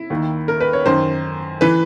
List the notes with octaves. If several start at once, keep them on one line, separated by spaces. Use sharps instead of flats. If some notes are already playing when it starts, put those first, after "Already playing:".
Already playing: E4
D#2 D#3
A#4
B4
C#5
F#2 D#3 C5
E3 B4